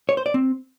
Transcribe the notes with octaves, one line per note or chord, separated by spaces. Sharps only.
C#5
C5
D5
C4